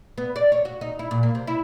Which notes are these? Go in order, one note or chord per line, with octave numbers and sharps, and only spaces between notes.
B3
D5
C#5
F#4
D#4
E4
A#2
A#3
C3
E4